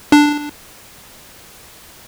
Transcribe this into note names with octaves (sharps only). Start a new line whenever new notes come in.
D4